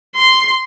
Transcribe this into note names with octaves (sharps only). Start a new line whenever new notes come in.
C6